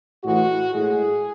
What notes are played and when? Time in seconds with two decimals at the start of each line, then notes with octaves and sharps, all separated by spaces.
0.23 A2 E3 G#3 F#4
0.73 A2 G#3 G#4